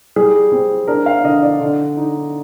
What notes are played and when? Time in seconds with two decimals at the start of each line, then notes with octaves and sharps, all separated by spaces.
0.16 G3 G#4
0.52 C4
0.87 D4 A#4
1.06 F5
1.24 D3 D#5
1.43 D5
1.61 D3
1.97 D#4